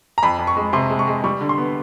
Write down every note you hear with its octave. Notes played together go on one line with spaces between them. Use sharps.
A#5
F2 B5
F2
C#6
G#3
C3 C6
G#3
C#6
G#3
G3 C#6
D3
C6
B3